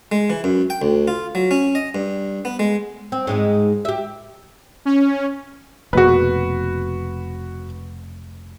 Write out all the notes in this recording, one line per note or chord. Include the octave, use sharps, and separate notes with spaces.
G#3
E3
F#2
G5
D2
F4
F#3
C#4
D#5
G2
B3
G#3
C4
G#2 G#3 D#4
G4 E5
C#4
F1 B2 A#3 F#4 B4